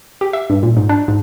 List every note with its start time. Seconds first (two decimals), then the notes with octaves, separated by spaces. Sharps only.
0.21 G4
0.33 E5
0.50 G2
0.63 A#2
0.77 G#2
0.89 D4
1.08 G#2